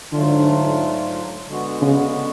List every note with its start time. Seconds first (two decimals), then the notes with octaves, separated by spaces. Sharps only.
0.12 G#2 D3 F#3 A3 D4 F4
1.47 D3 G#3 B3 F#4
1.82 C#3